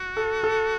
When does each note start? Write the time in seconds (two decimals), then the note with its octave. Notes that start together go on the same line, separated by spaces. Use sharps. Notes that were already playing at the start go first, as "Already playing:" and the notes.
Already playing: F#4
0.17 A4
0.43 A4